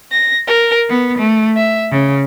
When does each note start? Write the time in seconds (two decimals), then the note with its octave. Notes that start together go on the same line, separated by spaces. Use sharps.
0.12 A#6
0.48 A#4
0.90 B3
1.19 A3
1.57 E5
1.91 C#3